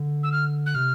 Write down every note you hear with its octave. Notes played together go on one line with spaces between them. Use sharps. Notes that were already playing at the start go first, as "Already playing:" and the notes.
Already playing: D3
E6
F6
F#6
C3 F6